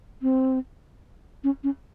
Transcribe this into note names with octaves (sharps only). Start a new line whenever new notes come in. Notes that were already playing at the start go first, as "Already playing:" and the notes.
C4
C#4
C#4